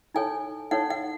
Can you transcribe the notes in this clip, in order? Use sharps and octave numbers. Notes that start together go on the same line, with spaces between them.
D#4 A4 C#5 G#5
D#4 A4 C#5 F#5
F#5